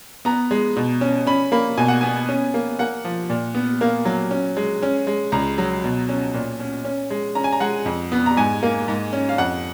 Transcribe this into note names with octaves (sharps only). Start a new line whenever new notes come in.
B3 A#5
G#3
B2
C#4
C#4 B5
A#3 B5
B2 G#5
F#5
B3 G#5
C#4
A#3
A#3 F#5
F3
A#2
B3
A#3 F5
F#3
C#4
G#3
C#4
G#3
C#2 A#5
F#3
B2
C#4
A#2
C#4
C#4
G#3
C#4 A#5
G#5
A#5
G#3 F#5
F2
B3
A#5
G#2 G#5
A#3
G#2
C#4
F5
F2 F#5